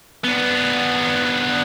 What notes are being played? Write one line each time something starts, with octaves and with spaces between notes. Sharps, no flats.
B3 D4